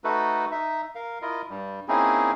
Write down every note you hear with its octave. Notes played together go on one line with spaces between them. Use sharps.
A3 D#4 F#4 A4 B4
D#4 E5
A#4 F5
E4 F4 A#4 D#5
G2 G3
A#3 C4 C#4 D#4 E4 G#4